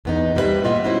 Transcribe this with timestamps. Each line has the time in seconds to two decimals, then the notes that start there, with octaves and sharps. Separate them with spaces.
0.05 E2 B3 D#4
0.35 G2 G3 C4 F4 B4 E5
0.64 A#2 F4 D#5 E5 F#5
0.84 B3 C#4 E4 F#4 C5